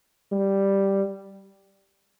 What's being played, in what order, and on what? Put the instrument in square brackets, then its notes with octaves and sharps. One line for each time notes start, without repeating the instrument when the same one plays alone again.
[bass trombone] G3